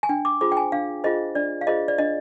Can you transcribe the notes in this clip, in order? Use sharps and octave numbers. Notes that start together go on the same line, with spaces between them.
G#5
D4 G5
D6
F4 G#4 C5 D6
G5
G#5
D4 F5
F4 G#4 C5 D#5
D4 D5
F5
F4 G#4 C5 D#5
D5
D4 D#5